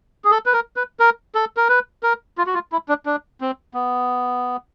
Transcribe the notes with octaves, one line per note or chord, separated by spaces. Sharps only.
G#4
A4
B4
A#4
B4
A#4
A4
A#4
B4
A#4
F4
F#4
F4
E4
D4
D4
C4
B3